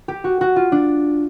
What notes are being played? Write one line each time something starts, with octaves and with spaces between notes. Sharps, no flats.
G4
F#4
F#4
F4
D4